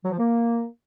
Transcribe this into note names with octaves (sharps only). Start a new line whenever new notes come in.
F#3
F3
A#3